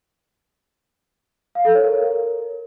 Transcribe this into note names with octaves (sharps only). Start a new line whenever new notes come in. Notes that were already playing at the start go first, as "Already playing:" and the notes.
F5
A4
C#5
A#4